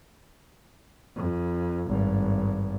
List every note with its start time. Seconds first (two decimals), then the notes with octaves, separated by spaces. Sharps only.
1.16 F2
1.87 G#1 G2